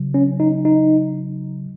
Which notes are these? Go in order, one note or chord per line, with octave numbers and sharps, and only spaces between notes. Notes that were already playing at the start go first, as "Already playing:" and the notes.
Already playing: C#3 F#3
C#4
D#4
D#4